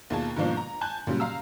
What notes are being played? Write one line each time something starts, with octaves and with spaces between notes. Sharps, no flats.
D#2 B2 F4 G#4 A5
G#2 B2 D#3 F3 A#3 D4
A#5
G#5 A5 F#6 G6
A#2 C#3 F#3 G3
F5 A#5 E6